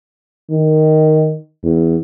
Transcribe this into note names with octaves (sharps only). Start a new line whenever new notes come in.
D#3
E2